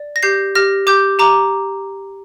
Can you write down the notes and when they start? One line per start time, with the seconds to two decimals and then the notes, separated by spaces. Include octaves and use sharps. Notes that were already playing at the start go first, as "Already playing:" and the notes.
Already playing: D5
0.16 A#6
0.23 G4 G6 C7
0.55 G4 F6 A#6
0.87 G4 D6 G6
1.19 G4 A#5 D6